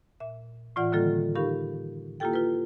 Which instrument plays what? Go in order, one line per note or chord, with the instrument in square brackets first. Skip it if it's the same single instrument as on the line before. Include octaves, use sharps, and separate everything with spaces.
[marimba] A#2 E5
A2 E3 F4 D5 F#5
D3 D#3 G3 A#3 F4 A4
D#4 G4 A#4 F5 B5 C#6
A#3 E4 F4 G4 A4 G5
F4 B4